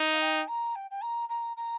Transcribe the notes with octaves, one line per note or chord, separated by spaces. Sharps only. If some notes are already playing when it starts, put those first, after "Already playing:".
Already playing: D#4
F5
G5
A#5
G5
G5
A#5
A#5
A#5